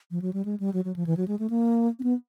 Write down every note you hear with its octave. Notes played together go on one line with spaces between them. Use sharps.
F3
F#3
G3
G#3
G3
F#3
F#3
F3
E3
F#3
G#3
A3
A#3
C4
B3